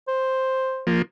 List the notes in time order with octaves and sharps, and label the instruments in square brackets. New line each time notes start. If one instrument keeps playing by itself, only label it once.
[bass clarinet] C5
[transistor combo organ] F3 A#3